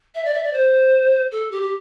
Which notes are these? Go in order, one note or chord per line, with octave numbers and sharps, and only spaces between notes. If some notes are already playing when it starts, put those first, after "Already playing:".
E5
D5
E5
D5
C5
A4
G4
G4